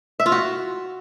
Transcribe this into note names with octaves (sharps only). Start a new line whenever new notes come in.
E5
F4
F#4